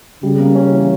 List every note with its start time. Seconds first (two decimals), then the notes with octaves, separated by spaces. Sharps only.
0.23 C#3 G3
0.39 A#3
0.55 C#4
0.72 E3